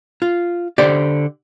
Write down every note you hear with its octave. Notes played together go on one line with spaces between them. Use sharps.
F4
D3 G4 C5 D5